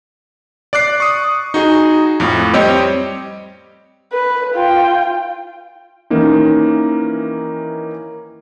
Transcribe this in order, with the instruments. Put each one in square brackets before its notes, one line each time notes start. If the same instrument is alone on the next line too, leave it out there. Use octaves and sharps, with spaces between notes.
[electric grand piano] D5 D6 F#6 C7
C#6 D#6
D#4 F#4 G#4
F2 A2
G3 C4 G4 C#5 D#5
[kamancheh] B4
F4 G5
[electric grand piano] D#3 E3 A#3 C#4 D#4